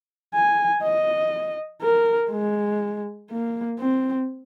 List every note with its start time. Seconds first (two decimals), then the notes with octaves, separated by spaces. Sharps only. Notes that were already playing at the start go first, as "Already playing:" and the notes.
0.34 G#5
0.83 D#5
1.82 A#4
2.31 G#3
3.30 A#3
3.79 C4